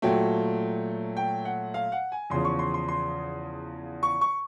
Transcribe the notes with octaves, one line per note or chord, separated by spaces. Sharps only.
A#2 F#3 A3 G5
G5
F#5
F5
F#5
G#5
E2 C#3 F3 C6
C#6
C6
C6
C6
C#6
C#6